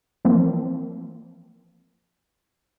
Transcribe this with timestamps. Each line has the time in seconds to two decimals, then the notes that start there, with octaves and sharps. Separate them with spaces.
0.25 E3 F3 A#3 C4